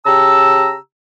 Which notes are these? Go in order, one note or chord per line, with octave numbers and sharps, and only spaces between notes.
C#3 G4 A5 A#5 E6